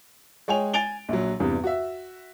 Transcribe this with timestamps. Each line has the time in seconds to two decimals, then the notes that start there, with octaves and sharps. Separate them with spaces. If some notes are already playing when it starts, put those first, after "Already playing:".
0.48 G#3 C#5 G5 G#5 F7
0.74 G#5 A6 D7 F7 G7
1.09 A#1 F#3
1.40 E2 G2 C3
1.64 F#4 E5